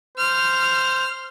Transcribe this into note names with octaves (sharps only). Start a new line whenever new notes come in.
C5 F6